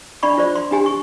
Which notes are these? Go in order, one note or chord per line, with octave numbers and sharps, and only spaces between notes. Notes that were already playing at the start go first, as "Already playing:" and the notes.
D4 D5 B5 C#6
F4 C5 D5
C6
D4 G4 G#5
C#6